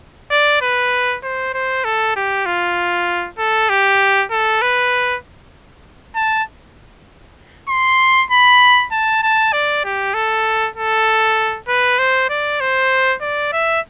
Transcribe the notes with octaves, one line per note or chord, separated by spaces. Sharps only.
D5
B4
C5
C5
A4
G4
F4
A4
G4
A4
B4
A5
C6
B5
A5
A5
D5
G4
A4
A4
B4
C5
D5
C5
D5
E5